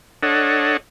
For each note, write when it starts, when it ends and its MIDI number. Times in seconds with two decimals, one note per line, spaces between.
0.23 0.77 62
0.23 0.77 69
0.23 0.77 73
0.23 0.77 75
0.23 0.77 78